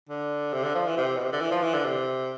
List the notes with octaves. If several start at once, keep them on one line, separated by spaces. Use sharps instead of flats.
D3
C3
D3
F3
E3
C3
B2
C3
D3
E3
F3
E3
D3
C3